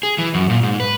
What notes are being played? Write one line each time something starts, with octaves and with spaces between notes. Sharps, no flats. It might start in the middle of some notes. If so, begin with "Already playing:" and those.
G#4
E3
F#2
A#2
G#2
B4